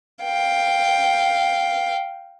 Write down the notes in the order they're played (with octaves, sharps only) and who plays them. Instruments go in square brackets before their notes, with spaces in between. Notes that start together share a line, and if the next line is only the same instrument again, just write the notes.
[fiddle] F5 G5